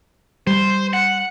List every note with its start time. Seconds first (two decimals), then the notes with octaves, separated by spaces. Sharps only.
0.47 G3 C5
0.93 F#5